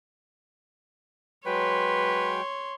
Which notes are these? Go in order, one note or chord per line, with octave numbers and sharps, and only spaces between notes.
F#3 G#3 B4 C#5 G5 C6